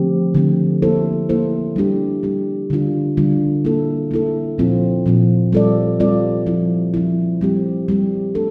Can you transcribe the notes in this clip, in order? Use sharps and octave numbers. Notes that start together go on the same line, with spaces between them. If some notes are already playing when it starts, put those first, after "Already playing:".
Already playing: D3 F3 A3 C4 G4
D3 F3 A3 C4 G4
A#3 E4 A4 C5
A#3 E4 A4 C5
G3 D4 G4
G3 D4 G4
D3 G3 D4 F4
D3 G3 D4 F4
A#3 E4 A4
A#3 E4 A4
A#2 F3 C4 F4
A#2 F3 C4 F4
G3 C4 F4 A4 D5
G3 C4 F4 A4 D5
F3 C4 E4
F3 C4 E4
G3 C4 G4
G3 C4 G4
A3 D4 A4